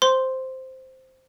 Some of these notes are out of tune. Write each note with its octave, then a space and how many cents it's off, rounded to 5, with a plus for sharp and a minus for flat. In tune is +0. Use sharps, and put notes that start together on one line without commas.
C5 +0 C6 +0